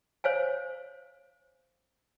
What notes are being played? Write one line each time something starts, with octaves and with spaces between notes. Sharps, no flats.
C5 C#5 F5 G#5